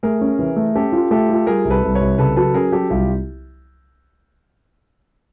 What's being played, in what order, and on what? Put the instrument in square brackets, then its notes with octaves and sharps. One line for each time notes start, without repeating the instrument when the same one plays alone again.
[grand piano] A3 [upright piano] G#4 A#4
[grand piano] C#4
E3
A3
[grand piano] C#4 [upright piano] G4 A4
[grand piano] F4
[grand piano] A3 [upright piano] G4 A4
[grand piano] F4
[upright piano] A4
[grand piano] G3 [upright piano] G#4 A#4
[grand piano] C2
[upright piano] A4 B4
[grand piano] C2
[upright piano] B4 C#5
[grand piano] C2
[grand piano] C#3 [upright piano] A4 B4
[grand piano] F#3 [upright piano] A4 B4
[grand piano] C#4 [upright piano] G#4 A#4
[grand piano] F#3 [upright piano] G4 A4
[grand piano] C2 [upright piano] F4 G4